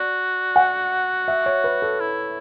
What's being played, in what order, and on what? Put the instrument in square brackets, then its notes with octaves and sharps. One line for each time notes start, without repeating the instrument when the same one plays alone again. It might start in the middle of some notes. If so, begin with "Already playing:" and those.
Already playing: [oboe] F#4 [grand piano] D5
[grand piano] F#5
E5
C#5
B4
A4
[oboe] E4